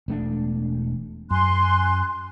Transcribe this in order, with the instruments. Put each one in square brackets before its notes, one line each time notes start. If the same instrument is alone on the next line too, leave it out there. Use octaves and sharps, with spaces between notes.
[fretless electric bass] E1 A3 D4
[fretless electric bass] F#2 [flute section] G#5 C6 F#6